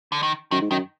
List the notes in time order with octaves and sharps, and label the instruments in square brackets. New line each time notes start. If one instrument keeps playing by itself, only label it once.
[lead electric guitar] D3
D#3
[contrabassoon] F#2 [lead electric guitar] D#3
[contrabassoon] G#2
[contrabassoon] F#2 [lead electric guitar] D#3